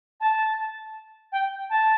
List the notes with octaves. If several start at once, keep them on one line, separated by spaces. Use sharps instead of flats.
A5
G5
A5